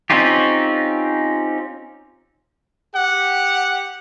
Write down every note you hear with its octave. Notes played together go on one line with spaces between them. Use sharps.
C4 C#4 D#4 F4 G4
G4 F#5